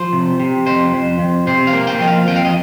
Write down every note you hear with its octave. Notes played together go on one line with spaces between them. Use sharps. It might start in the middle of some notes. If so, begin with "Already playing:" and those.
Already playing: F3 C5
C3
C3
F2 C5
F2
F2
C3 C5
F5
A#3
G5
F3 D#5
F5
F2 G5
F5
D#5